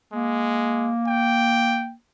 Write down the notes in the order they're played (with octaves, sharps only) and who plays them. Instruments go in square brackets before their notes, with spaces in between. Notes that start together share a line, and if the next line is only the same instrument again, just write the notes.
[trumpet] G#3 [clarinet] A#3
[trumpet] G5